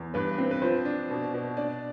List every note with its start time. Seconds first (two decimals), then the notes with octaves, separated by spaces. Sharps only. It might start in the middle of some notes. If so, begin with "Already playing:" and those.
Already playing: E2
0.14 G2 B4
0.38 C4
0.51 B4
0.62 F3 C5
0.85 D4
1.10 B2
1.34 B2
1.57 D4 D5